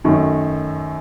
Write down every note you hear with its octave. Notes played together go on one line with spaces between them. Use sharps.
F#2 D#3 A3